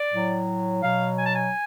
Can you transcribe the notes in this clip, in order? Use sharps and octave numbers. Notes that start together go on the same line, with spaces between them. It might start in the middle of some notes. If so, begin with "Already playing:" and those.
Already playing: D5
A2 F#3
B2 F#3 F5
G#5
A5
G#5